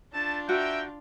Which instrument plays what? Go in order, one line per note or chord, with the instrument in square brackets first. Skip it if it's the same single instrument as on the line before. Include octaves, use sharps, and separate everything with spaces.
[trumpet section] A3 A5 [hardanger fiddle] D4 F4
[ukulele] F#4 [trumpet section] A#4 G5 [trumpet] E5